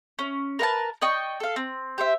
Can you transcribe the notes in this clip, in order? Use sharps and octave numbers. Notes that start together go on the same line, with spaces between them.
C#4
A#4 B4 F#5 A5
D5 D#5 G5 C#6
A4 F5
C4
G4 C5 E5